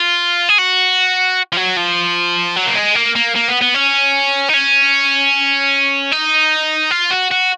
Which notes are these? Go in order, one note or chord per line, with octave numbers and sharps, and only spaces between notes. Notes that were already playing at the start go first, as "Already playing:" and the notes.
Already playing: F4
G#4
F#4
F3
F#3
F3
F#3
A#3
G#3
A#3
A#3
A#3
B3
B3
C#4
D#4
C#4
D#4
F4
F#4
F#4